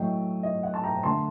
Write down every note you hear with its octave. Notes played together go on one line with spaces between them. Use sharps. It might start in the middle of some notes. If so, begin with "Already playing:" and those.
Already playing: A2 F#3 A3 D#5 G5
D#5
F#5
A5
G5 A#5
D3 A3 D4 A5 C6